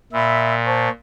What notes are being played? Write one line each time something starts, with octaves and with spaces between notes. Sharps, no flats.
A#2 E5 B5 E6
C5 A5 C#6